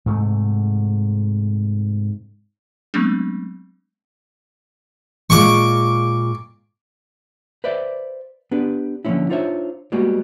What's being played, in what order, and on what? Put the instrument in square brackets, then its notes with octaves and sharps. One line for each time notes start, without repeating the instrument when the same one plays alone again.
[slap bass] G#2 C3 A3
[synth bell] F#3 G#3 A3 B3 C4 D4
[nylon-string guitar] A#2 G#3 F4 [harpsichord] C#6 D6
[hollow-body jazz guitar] B4 C5 D5 E5
B3 D4 G4 B4
D3 F3 A#3 C4 C#4 E4
D4 D#4 F4 C5 C#5 E5
G3 G#3 A#3 B3 F#4